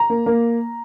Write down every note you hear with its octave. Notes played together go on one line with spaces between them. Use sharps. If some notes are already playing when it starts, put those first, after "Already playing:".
Already playing: A#5
A#3
A#3